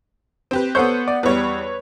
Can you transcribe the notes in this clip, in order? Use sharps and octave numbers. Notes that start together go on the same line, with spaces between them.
C4 G4 B4
B3 A4 C5 C#5 F#5 G6
D5
E2 G3 B4 C#5